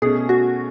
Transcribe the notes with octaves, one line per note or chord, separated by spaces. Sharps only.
B2 A3 C#4 G#4
F#4